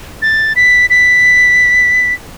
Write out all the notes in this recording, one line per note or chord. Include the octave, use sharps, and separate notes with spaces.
A6
B6
B6